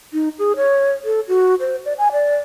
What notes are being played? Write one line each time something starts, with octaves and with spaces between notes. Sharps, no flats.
D#4
G#4
C#5
A4
F#4
C5
D5
G#5
D5